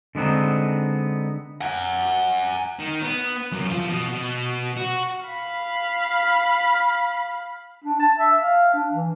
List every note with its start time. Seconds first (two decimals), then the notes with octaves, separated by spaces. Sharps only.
0.15 D3 G#3 B3 C4 D#4
1.61 F#5 G#5
2.80 D#3
3.02 B3
3.52 F#2
3.70 F3
3.88 B2
4.08 B2
4.77 F#4
5.26 F5 B5
7.84 D4
8.00 A5
8.19 E5
8.38 F5
8.74 D4
8.92 E3